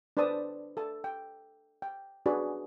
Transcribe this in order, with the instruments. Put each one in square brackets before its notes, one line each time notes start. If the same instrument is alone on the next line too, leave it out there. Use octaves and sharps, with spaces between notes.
[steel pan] D4 B4 C5 D5 A5 D#6
A4 A5
G5
G5
D4 F#4 G#4 B4 D5